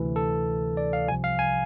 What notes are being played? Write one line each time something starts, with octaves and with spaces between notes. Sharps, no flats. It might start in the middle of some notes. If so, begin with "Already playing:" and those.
Already playing: D2 C3 E3
A4
D5
F5
C2 C3 F3 G#5
F5
G#5